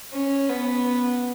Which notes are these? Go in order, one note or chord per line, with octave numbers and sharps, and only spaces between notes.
C#4
B3